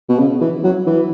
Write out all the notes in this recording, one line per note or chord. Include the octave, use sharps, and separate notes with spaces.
B2
C#3
E3
F#3
E3